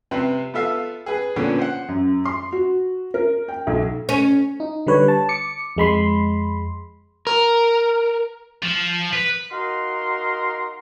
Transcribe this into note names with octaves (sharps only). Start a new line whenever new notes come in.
C3 C4 B4
B3 F4 A4 E5 F5
G#4 B4
A#2 D3 B3 C#4
C5 F#5
F#2
C6
F#4
A#4
G5
B1
C#4
D#4
D3 G3 B4 C#5
A5
D6 C#7
F2 G#3 B5 C6
A#4
F3
B4
D#4 F#4 A#4 F5 A#5 C6